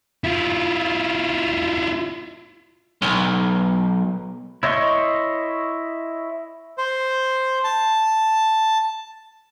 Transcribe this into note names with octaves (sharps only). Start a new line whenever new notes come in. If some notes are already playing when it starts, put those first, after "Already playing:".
E4 F4
B1
E4 C#5 D#5 C6 C#6
C5
A5